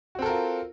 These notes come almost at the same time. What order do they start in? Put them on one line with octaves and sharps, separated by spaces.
F#4 C4 A4 A#4 F4